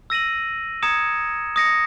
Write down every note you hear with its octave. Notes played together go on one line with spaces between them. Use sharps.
E6 A#6 D#7 F#7
A#5 D#6 G#6 C#7 E7
D#6 A#6 C#7